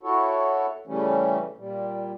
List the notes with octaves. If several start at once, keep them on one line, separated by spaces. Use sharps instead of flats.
E4 F#4 A4 C#5
C#3 E3 G3 A3 C#4
A#2 G3